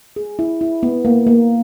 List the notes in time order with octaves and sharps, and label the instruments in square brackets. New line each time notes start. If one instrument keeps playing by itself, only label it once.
[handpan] G#4
E4
E4
B3
A#3
A#3